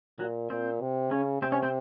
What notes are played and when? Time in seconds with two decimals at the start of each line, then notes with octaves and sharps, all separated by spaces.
0.19 A#2 F#3 F#4
0.50 A#2 C4 C5
0.81 C3
1.11 C#3 C#4 C#5
1.42 C3 C4 C5
1.52 C#4 C#5
1.63 C4 C5